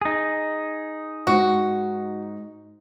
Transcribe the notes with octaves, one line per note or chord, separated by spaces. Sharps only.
D#4 G#4
G#2 F#4